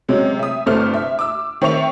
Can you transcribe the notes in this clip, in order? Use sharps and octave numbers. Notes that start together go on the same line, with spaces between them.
C3 F#3 G#3 C#4
E5 D#6
G1 C3 A3 C5 F6
E5
D6 E6
D#3 C4 E5 C#6 F7